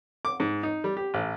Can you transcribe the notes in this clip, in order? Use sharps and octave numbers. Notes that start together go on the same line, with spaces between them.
D6
G#2
D#4
G3
G4
A1